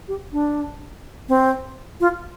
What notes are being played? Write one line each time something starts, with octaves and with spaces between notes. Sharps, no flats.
G4
D4
C4
F4